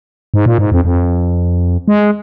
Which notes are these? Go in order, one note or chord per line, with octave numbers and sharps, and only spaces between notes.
G#2
A#2
G#2
F2
F2
G#3